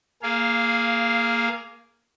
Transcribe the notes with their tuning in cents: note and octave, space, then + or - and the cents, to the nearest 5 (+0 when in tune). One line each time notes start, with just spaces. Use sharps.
A#3 +0 G#4 +15 F5 -15